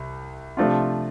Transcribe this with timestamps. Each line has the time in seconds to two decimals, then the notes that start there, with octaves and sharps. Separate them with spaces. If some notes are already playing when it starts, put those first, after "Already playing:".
Already playing: C2
0.57 C3 F3 A3 D4 F4